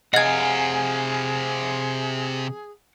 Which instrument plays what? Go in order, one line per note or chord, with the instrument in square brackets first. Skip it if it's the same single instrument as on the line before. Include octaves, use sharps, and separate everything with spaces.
[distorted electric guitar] C3 F5 [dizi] G#4 [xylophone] D#5 G#6 [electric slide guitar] F#5 G#5